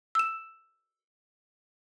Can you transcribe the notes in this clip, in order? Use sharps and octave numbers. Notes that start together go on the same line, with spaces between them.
E6 E7